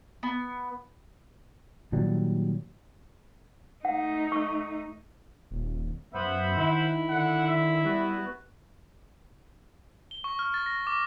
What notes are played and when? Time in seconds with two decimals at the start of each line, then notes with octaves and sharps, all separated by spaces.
0.23 B3
1.92 A#2 D#3 F#3 G3
3.85 A3 D#4 F#5
4.32 C#6
5.51 D#1
6.15 F#2 B3 C5 E5 F#5 B5
6.57 D#3 E4
7.09 D3 F#5
7.48 E5
7.85 G3 B3 F#4 B4
10.11 G7
10.24 C#6
10.39 F6
10.54 A6
10.66 A#6
10.87 D6